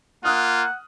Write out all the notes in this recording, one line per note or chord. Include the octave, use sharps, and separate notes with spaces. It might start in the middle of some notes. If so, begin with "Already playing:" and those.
A#3 F4 F#5 D#6 F6 F#6